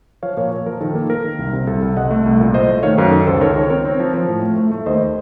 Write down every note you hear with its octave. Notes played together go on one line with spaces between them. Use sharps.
F3 C#5 F5
A#2 A#4 C#5
A#2
F3 A#4
D#3 A4
A#3
A#3 A#4
D#3
C2
C3
C2 A4
C2
C2 D#5 F#5
A3
C2
A#2
A3 C5 D#5
A3
D#3 C#5 F5
F#2 A#4
D#3 A4
C#2 A4 C5
D#3 A#4 C#5
D#3
C4 A#4 C#5
C4
F3
F3
A2
A3
A3
A3
D#2 C5 D#5